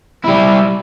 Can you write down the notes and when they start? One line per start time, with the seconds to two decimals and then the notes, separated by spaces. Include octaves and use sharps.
0.24 G3 E4